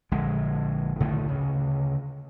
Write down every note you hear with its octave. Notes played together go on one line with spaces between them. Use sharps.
A#1 D3 G#3
A2 D3 D#3 A3
D2 C#3